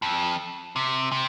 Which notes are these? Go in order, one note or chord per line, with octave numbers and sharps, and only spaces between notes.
F2
C3
C3